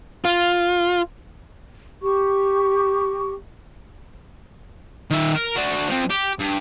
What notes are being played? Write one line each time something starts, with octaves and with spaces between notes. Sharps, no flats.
F4
G4 C#6
D#3 E5
A#4
D4 F#4
F3 C4
G4
G2